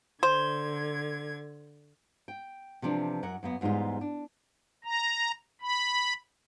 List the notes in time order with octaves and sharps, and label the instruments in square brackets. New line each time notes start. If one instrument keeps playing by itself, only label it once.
[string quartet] D3 G#6 [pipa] C5
[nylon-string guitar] G5
C3 E3 F3 D4
F#2 A#4 F#5
F#2 A#3 B3
E2 G#2 G3 D#4 F4
D4
[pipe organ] A#5
B5